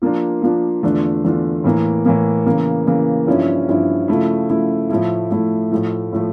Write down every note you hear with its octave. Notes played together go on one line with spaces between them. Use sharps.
F3 A#3 D4 F4
F3 A#3 D4 F4
E2 D3 A3 D4 F4
E2 D3 A3 D4 F4
A2 E3 A#3
A2 E3 A#3
C#3 E3 A#3
C#3 E3 A#3
G2 F3 C#4 E4
G2 F3 C#4 E4
C#3 F3 A3 E4
C#3 F3 A3 E4
A2 F3 A3 E4
A2 F3 A3 E4
A2 F3 A3
A2 F3 A3